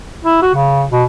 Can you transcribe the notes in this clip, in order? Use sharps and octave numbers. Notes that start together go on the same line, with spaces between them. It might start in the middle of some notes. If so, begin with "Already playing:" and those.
E4
F#4
C#3
B2